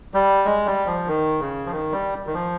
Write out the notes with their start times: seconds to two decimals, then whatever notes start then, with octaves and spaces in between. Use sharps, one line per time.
0.14 G3
0.45 G#3
0.66 G3
0.87 F3
1.08 D#3
1.40 C#3
1.66 F3
1.71 D#3
1.92 G3
2.27 D#3
2.34 F3